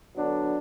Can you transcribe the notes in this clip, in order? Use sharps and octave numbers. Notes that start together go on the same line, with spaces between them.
D3 F#3 B3 D4